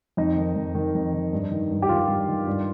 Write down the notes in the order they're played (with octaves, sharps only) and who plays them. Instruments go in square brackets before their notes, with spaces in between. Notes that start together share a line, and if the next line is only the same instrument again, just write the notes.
[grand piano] F2 D#4
D#3
F2
D#3
F2
D#3
G2
D#3
G2
G4
D#3 F4
G2
D#3
G2